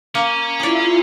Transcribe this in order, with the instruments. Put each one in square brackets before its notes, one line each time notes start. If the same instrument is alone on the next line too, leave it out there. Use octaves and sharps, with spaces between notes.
[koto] A#3 [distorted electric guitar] C#4
[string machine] E4 F4 [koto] G#4 D5